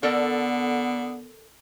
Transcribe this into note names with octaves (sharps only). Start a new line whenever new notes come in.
D3 B3 A4 A#4 D5